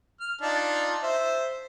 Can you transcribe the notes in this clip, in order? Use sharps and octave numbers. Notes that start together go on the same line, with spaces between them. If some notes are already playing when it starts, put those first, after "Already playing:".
F6
D4 D#4 F4
C5 E5